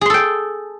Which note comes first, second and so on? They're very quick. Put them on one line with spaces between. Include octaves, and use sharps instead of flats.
G#4 C6 A4 G5